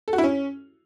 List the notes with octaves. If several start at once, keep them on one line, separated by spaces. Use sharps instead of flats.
A4
F#4
E4
C#4